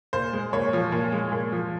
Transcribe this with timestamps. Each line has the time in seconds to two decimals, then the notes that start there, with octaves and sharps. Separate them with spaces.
0.13 A#2 C5
0.33 G#3
0.53 A#2 C#5
0.73 F3
0.92 A#2
1.12 G#3
1.32 A#2
1.52 F3